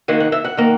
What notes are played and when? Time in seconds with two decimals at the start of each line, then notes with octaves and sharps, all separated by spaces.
0.08 D#2 D#3 A#3 F#5
0.20 F#5
0.32 E5
0.44 F#5
0.57 D#3 A#3